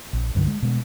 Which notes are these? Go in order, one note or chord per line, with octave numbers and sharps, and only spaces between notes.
A#1
C2 G2 D3 F#3
G#3
B2 G#3